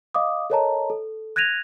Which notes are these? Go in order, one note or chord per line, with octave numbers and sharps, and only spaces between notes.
D#5 F5 D6 D#6
A4 A#4 C#5 D#5 A5 A#5
A4
F#6 G#6 A#6 D#7 F7